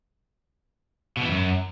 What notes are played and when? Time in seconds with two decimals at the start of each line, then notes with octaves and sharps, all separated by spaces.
1.17 B2
1.23 E3
1.29 F#2